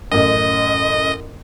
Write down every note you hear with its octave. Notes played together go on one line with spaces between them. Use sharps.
A1 F#2 D#5